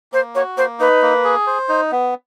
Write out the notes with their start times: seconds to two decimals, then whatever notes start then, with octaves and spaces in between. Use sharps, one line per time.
0.12 A#3 C5
0.35 F#4 C#5
0.57 A#3 C5
0.80 D#4 B4
1.02 A#3
1.24 G#4
1.47 C5
1.69 D#4
1.92 B3